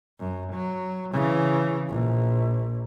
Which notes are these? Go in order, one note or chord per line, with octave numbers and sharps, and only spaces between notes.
F#2
F#3
C#3 E3
A#1